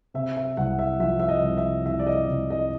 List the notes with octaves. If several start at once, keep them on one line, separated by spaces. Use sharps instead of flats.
C3 E5
E5
C2 F#5
E5
F3 E5
E5
D#5
C2
E5
C2 E5
D5
D#5
C2
D#5